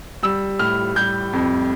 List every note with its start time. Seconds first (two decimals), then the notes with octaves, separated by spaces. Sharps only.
0.23 G3 E6
0.59 A2 F6
0.95 G3 G6
1.33 F2